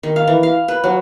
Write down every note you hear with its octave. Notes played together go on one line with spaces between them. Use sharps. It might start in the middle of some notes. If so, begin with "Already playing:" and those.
D#3
F5
E3
F5
B4
F#3